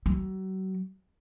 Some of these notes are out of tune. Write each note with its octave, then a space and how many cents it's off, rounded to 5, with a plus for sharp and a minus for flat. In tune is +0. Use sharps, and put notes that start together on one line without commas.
F#3 +40